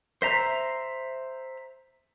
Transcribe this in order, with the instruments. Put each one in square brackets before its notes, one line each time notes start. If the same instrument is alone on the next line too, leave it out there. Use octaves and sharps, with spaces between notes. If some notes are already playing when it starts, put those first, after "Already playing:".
[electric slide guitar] C5 E5 A#5